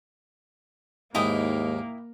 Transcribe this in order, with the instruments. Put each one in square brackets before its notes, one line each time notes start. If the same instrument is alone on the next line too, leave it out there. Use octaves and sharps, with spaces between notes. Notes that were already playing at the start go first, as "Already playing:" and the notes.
[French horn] D#2 [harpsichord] G#2 D#4 [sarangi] A#3 [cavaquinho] E4 G5 D#6